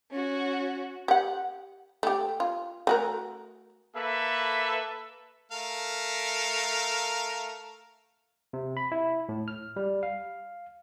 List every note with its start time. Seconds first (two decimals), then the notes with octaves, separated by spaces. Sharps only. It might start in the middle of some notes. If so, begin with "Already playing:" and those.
0.10 C#4 F#4
1.08 G4 F#5
2.03 A3 G4
2.40 F4
2.87 A3 F#4 A#4
3.96 A#3 A4 B4 E5
5.52 A3 A#4 F5
8.53 C3
8.77 B5
8.92 E4
9.29 A2
9.48 F6
9.76 G3
10.03 F5